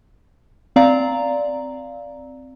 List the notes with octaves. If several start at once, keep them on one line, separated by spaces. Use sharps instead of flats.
C4 D5 F5 A#5